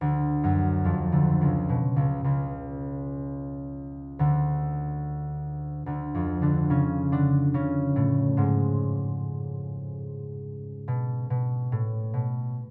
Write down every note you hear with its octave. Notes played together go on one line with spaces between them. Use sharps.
D2 D3
F#2 F#3
F2 F3
D2 D3
C#2 C#3
B2
C#2 C#3
C#2 C#3
D2 D3
D2 D3
F2 F3
D3 D4
C#3 C#4
D3 D4
C#3 C#4
A2 A3
G#2 G#3
B2
B2
A2
B2